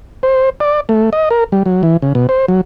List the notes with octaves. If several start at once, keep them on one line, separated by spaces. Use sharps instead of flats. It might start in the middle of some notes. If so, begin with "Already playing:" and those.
C5
D5
A3
D#5
A#4
G3
F#3
E3
C#3
B2
C5
F#3